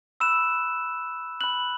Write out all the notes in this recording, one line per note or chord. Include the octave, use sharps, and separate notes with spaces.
B5 E6 F#6 E7
B5 F#6 F#7